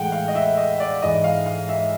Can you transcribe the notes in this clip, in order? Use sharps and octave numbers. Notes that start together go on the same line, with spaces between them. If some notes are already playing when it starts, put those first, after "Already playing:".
Already playing: A2 E3 G#3 F#5 G5
F5
D#5
E5
D#5
D5
G#2 E3 G#3 D#5
F5
F5
E5